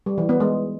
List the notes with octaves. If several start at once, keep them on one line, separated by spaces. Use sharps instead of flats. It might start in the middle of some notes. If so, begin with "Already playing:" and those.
G3
E3
B3
G#3